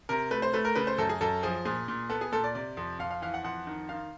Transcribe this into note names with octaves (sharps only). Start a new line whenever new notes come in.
C3 A#4
A3 B4
C5
A3 B4
A#4
C#3 B4
C5
F#2 A4
G#4
F#2 A4
F3 G#4
A#2 G#4
A#2
B3 A4
G#4
A#2 A4
D5
C3 D5
F2
F2 F5
F5
E3 F5
F#5
F2 F#5
D#3
D#3 F5